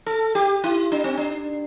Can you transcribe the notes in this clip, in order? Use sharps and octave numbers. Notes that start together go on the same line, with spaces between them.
A4
G4
E4
D4
C4
D4